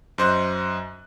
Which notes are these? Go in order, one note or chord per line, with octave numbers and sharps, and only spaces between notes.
F#2 C5 D#5 F#6